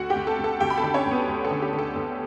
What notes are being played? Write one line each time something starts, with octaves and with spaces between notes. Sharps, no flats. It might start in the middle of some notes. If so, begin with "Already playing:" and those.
Already playing: D2 F#4 F#5
G4 G5
D2
A4 A5
D2
A4 A5
D2 G4 G5
B5
A4 A5
D3
C#4 C#5
D2
B3 B4
D2
A4
D3
G4
D3
A4
D2